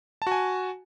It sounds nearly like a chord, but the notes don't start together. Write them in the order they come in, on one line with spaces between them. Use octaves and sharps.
A5 F#4 G#5